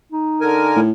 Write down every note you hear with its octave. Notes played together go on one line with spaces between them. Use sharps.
D#4
D3 A#4 G#5
A2